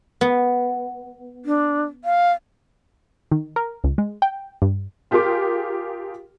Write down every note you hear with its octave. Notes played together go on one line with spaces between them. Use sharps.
B3
D4
F5
D#3
A#4
C#2
G#3
G5
G2
F4 G4 G#4 A#4 C6 D6